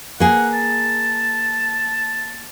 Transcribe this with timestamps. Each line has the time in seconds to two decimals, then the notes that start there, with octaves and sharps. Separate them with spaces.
0.20 A#3 G#4 F#5
0.53 A5